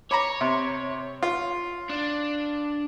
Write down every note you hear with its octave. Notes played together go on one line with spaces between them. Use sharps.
C#5 A#5 B5 D6
C3
F4
D4